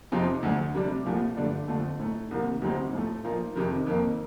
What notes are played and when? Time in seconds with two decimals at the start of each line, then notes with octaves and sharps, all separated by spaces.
0.12 F2 C3 F3 C4 D#4
0.43 D2 D3 A3
0.75 C3 G3 D4
1.06 C2 A#2 F3 A3
1.36 G2 D3 A3 D4
1.68 F2 D3 F3 A3
2.00 A2 A3 D#4
2.31 C2 C3 D#3 A#3
2.62 D2 C3 G3 C4 D#4
2.93 A2 F3 A3
3.24 A#2 F3 A#3 D#4
3.55 F2 C3 D#3
3.87 F2 D#3 A#3